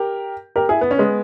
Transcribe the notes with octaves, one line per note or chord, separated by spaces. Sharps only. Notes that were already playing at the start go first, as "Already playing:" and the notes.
Already playing: G4 A#4
G4 A#4
E4 G#4
B3
C#4
G#3 B3